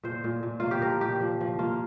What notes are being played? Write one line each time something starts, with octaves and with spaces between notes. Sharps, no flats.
A#2 C5
A#2
A#2
A#3 F4
G4
F3 A#4
A#2 G4
F3
F3
A#3 F4